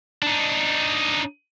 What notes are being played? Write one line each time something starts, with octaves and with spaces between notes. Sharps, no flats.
D4 D#4